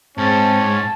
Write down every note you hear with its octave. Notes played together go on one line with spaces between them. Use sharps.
G#2 C4 C#4 A5